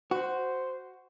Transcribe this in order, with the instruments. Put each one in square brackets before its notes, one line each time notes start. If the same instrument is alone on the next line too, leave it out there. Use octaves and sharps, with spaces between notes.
[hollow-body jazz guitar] F#4 [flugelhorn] C5